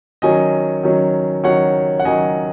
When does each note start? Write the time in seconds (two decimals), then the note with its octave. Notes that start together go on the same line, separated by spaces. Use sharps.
0.22 D#3 F#3 C#4 D#5 G#5
0.83 D#3 F#3 C#4
1.44 D#3 F#3 C#4 C#5 F#5
2.00 F#5
2.05 D#3 F#3 C#4 D#5 G#5